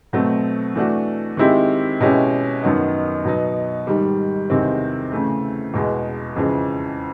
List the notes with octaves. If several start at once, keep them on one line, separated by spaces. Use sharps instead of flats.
B2 F#3 A3 C4
E3 A3 D4 F#4
D#3 G#3 C4 E4 G4
B2 G#3 C#4 E4 G4
F#2 D#3 F#3 B3 D#4
B2 F#3 B3 D#4
G#2 D#3 G3
E2 C3 D#3 G#3 C4
C#3 E3 A3
E2 B2 G#3
F2 C#3 E3 G#3